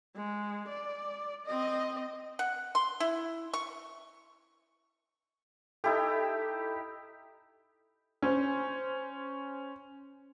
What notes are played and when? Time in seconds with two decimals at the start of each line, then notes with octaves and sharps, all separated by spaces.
0.16 G#3
0.69 D5
1.46 C4 D#5
2.39 F#5
2.75 C6
3.00 E4
3.53 C#6
5.84 D#4 E4 G4 A4
8.22 C#4 C5